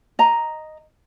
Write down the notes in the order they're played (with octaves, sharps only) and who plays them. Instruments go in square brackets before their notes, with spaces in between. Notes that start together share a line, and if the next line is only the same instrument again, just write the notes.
[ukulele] D#5 A#5